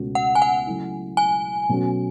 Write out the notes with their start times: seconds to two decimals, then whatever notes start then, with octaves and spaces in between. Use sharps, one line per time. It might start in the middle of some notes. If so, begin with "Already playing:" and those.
Already playing: C#2 B2 A3 C#4 F#4
0.15 F#5
0.35 G#5
0.42 F#5
0.67 C#3 F#3 A3 E4
1.17 G#5
1.69 B2 F#3 A3 C#4 F#4